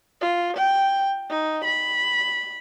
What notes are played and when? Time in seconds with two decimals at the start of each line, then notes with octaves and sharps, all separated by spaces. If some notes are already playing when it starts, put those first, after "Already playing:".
0.21 F4
0.57 G5
1.30 D#4
1.64 B5